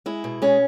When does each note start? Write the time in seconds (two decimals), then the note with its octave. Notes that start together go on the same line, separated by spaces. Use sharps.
0.06 G#3 E4
0.24 B2
0.42 G#3 C#4